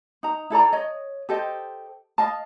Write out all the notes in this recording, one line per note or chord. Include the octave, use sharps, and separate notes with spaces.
D#4 A#5
E4 A4 D5 A#5
C#5 D#5
G4 A4 C5 D#5
D#5 F5 A5